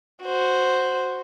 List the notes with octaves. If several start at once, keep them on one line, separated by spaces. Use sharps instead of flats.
F#4 C5